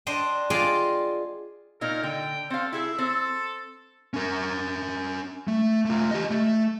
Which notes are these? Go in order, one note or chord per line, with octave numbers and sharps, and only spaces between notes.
D4 C5 D#5 G5
F4 G#4 D5 D#5 F5 G5
A#2 A#3 D#4 A#4
D3 G5
C4 A4 F5
E4 G#4 A4 E5
C4 A4
C#4 A#4
A3
A3 F4
G4 D#5
A3